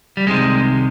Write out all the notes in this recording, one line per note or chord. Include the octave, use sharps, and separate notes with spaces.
G3
C2 C3 D#3 G#3